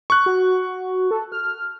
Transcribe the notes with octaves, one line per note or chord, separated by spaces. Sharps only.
C#6 F#6
F#4
A4
F6